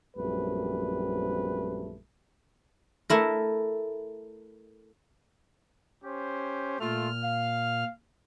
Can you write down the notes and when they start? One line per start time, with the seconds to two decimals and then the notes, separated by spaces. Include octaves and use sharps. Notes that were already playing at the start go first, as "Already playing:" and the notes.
0.17 A#1 F#2 G3 A3 C4 B4
3.10 A3 E4 A#4
6.04 C#4 G4 C5
6.80 A#2 A3 F4 F6
7.23 F5